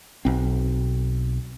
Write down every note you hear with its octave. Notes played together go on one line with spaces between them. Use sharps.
B1 C4